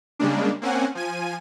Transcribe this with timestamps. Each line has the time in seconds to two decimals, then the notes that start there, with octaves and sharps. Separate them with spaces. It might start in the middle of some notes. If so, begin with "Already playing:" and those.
0.19 C#3 G3 G#3 A#3 D4
0.62 A#3 C4 C#4 F#5 G#5
0.95 F3 G#5 D#7